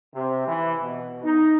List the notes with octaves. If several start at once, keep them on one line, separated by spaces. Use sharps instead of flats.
C3
E3
B2
D#4